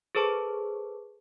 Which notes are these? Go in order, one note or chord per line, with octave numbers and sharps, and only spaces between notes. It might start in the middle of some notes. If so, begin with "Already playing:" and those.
G#4 A4 B4 C5 A5 C#6